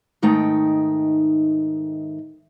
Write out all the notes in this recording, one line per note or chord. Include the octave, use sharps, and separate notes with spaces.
G#2 D#3 A3 D#4 G5